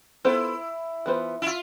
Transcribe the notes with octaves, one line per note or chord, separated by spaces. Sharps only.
B3 E4 F4 A4 C5
E3 B3 F4 C5
E4
F4